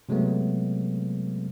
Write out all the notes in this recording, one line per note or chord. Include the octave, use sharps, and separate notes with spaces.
C3 F#3 G#3 A3 B3